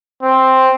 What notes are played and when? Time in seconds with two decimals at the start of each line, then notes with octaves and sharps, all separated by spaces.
0.22 C4